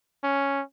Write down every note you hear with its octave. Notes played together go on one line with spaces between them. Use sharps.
C#4